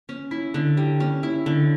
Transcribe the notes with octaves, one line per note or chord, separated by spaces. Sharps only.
C#4
E4
D3
G3
C#4
E4
D3